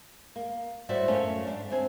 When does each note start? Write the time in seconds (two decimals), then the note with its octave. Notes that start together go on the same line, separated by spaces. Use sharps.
0.36 A#3
0.89 A2 G3 F#4 C5 D5 E5
1.08 F#2 A3 C#4 F5
1.47 G#2 D4
1.70 D2 C4 G#5